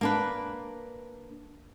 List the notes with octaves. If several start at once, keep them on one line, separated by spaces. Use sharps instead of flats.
A#3 D4 B4